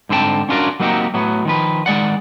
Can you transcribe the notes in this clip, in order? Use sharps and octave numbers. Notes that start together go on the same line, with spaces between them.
G#2 D3 C4 A4 G5 A5
C#4 D4 F4 F#4 A#4 D5
F#3 A#3 C4 D#4 F#4 G4
A2 F#3 B3
D#3 F3 B4
D#3 G#3 D5 F#5